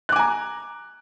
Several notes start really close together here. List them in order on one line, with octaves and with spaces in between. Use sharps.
F#6 D6 G#5 A#5